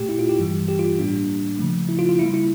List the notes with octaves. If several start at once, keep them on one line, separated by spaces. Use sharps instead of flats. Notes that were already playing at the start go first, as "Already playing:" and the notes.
Already playing: A#2 A3 G4
E4
F4
G4
G2 E3 G3
G4
F4
A2 G3 A#3 D4
C#3 F3 A3
E4
F4
F4
C#3 G3 A#3 E4
E4